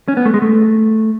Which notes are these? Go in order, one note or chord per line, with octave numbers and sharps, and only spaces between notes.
C#4
B3
A3
G#3
A3